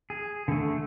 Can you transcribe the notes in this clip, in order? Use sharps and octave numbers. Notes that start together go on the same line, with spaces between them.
G#4
D3 A3